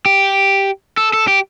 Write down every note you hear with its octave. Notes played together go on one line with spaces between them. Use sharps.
G4
A4
A4
G4